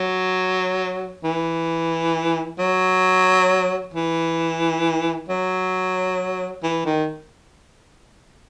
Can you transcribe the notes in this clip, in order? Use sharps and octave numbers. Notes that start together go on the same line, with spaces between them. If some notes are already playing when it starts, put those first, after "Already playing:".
Already playing: F#3
E3
F#3
E3
F#3
E3
D#3